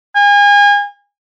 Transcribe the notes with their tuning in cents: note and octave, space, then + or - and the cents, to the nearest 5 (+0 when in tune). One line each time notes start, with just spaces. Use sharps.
G#5 -35